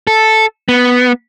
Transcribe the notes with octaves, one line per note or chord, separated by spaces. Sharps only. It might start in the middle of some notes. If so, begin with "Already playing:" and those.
A4
B3